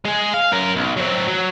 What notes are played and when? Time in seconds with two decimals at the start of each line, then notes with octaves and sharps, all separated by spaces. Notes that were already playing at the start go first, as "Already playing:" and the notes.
0.05 G#3 G#4
0.34 F5
0.52 F#2 A#4
0.75 B1
0.97 F#3 C4
1.28 F#3